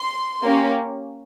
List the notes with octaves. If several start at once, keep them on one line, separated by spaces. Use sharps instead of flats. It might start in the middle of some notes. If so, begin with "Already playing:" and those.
Already playing: C6
A#3 C#4 G4